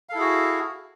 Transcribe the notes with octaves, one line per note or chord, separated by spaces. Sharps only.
E4 F#4 G#4 A4 F5